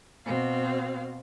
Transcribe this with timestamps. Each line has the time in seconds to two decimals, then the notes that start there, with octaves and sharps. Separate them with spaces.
0.24 B2 C4 F5